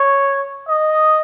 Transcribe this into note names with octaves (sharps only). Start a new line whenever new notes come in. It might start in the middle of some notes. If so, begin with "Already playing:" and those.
Already playing: C#5
D#5